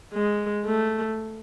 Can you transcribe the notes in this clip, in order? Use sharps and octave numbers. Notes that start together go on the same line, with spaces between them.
G#3
A3